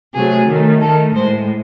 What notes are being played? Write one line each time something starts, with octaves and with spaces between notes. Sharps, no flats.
C3 F#3 A3 G#4
D#3 A3
D#3 A3 A4
A2 G#3 C5